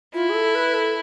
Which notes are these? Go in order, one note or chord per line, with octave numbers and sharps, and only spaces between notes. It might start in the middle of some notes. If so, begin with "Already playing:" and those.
E4 F4
G#4
A4
B4
A4